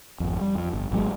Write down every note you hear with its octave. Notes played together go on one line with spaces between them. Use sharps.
G#1 F2
G3
F2
G1
G#1 F#3 G#3